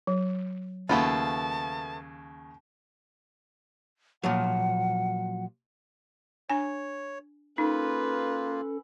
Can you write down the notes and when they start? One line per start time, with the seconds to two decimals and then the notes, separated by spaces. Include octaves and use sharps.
0.07 F#3
0.89 D#2 C#3 A3 B3 F4 A5
4.24 A#2 F3 F#3 F#5
6.50 D4 C#5 G#5
7.58 A#3 C#4 D#4 F4 A4 B4